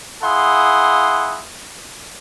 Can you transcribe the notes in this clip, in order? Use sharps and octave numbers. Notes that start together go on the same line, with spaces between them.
E4 G#4 F5 F#5 C6 D#6